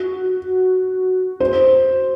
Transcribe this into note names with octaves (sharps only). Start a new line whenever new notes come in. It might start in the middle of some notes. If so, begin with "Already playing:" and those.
Already playing: F#4
C5